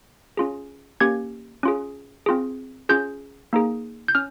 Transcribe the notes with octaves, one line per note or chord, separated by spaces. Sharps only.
C#4 F4 G#4
A#3 C#4 G4 G#6
C#4 F4 G#4
C4 F4 G#4
C#4 F4 G#4 G6
A#3 D#4 G#4
G6
C#4 F6